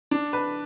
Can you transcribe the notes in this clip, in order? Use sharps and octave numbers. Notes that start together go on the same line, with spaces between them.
D4
B4